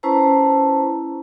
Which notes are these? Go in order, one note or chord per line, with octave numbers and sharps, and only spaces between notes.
C#4 E4 B4 C5 A5 A#5